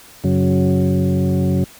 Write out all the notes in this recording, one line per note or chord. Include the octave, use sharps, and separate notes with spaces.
F#2 C#3 F#3